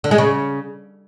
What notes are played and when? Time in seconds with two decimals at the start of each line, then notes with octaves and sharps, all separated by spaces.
0.04 D3
0.11 G#3
0.18 C#3